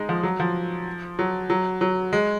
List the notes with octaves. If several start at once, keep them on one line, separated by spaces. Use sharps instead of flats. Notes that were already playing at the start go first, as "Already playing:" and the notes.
Already playing: G#3 D#4
F3
F#3
F3
F#3
F#3
F#3
G#3